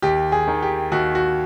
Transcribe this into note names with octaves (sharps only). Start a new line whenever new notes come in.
D#2 G4
G#4
D#3
G4
D#2 F#4
F#4